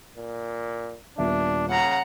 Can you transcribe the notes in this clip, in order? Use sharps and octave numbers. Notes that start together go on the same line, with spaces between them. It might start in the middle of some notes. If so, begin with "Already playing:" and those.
A#2
D#1 B3 D4 E5
C#3 F#5 A#5